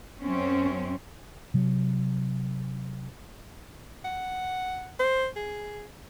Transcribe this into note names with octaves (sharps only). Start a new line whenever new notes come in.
F#2 C4 C#4
C3 F#3
F#5
C5
G#4